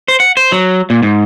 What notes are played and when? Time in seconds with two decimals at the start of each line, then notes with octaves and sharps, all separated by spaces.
0.08 C5
0.20 F#5
0.37 C5
0.52 F#3
0.90 A#2
1.03 G#2